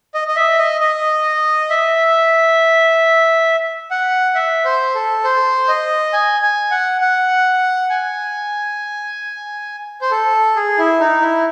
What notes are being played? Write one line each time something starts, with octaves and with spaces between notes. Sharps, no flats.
D#5
D#5
E5
D#5
D#5
E5
F#5
E5
C5
A4
C5
D#5
G#5
G#5
F#5
F#5
G#5
C5
A4
G#4
E4
D#4
E4